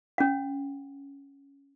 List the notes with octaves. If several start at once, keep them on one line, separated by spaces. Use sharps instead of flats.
C#4 F#5